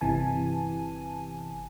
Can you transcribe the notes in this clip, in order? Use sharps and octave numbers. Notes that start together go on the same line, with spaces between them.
G1 C3 E3 G#5 A5